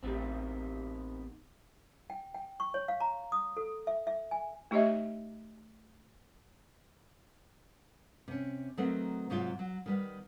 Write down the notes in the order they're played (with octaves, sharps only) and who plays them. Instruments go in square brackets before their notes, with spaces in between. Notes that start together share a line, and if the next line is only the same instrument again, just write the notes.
[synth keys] A1 G4 [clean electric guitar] D#3 B3 C4
[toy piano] G5
G5
C#6
C#5
F5
A#5
D#6
A4
E5
E5
G#5
[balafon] A3 D#4 G4 C#5 D#5 E5
[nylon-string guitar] C3 C#4
D#3 F#3 A3 B3 C4
G#2 C3 F#3 G#3 C4 F4
F#3
D#3 G3 B3